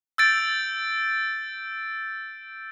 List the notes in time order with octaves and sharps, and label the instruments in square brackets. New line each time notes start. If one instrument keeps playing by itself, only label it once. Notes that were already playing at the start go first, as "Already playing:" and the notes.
[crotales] E6 G6 A6 D7